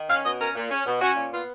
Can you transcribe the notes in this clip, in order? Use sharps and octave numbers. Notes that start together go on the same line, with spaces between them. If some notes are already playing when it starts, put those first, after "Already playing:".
Already playing: D#3
C#4 F5
B2 D#5
C#4 A#4
A#2
C#4
B2
C#4 F#4
A#2
B3 F4